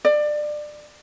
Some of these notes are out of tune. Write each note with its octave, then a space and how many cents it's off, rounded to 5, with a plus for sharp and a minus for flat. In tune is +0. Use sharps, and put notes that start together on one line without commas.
D5 +25